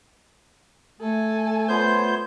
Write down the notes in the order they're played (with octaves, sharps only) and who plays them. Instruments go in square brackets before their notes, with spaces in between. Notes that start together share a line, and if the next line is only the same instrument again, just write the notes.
[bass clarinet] A3 [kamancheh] A4 G#5
[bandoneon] B3 C5 G6 [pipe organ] F4 C#5 C6